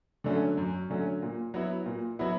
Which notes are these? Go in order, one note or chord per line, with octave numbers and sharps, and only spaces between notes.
D3 F#3 A3 C#4
F#2
D3 F#3 A3 C#4
A#2
F#3 B3 E4
A#2
F#3 B3 E4